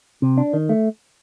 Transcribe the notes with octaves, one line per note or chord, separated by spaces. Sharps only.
C3
D4
D#3
A3